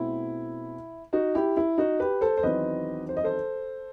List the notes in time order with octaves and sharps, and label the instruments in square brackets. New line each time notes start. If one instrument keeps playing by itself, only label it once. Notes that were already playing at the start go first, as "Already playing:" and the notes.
Already playing: [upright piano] B2 A3 C4 E4
D#4 F#4
E4 G4
E4
D#4 F#4
G4 B4
A4 C5
C5
E2 D#3 F#3 C4 B4 D#5
C5
D#5
A4 C5